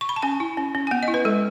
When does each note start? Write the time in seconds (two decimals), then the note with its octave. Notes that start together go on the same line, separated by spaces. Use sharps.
0.01 C#6
0.09 B5
0.16 A5
0.23 C#4 G#5
0.40 E4
0.57 C#4
0.75 C#4
0.87 G#5
0.91 B3 F#5
1.03 D#5
1.08 E4
1.14 B4
1.25 G#3 A4